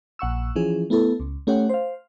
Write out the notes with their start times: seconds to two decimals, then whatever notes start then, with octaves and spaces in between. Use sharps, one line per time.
0.19 A#1 F#5 C#6 E6
0.56 E3 F3 C#4 G#4
0.90 A3 B3 E4 A4
1.20 C#2
1.47 A3 C#4 G4 C#5 F#5
1.69 C5 F5